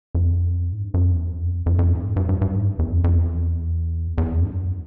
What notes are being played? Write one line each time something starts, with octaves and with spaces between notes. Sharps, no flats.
F2
G#2
G2
F#2
F2
E2
F2
F2
F2
G2
G#2
G2
G2
G2
G#2
G2
E2
F2
F2
E2
E2
F2
G2
F#2